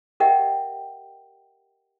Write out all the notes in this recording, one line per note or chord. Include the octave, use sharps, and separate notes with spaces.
G4 A#4 D#5 E5 F#5 G5